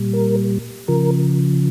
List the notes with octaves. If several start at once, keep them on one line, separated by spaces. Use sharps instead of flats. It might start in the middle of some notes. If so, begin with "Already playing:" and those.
Already playing: A#2 G3
A#4
C#3 F3 A#4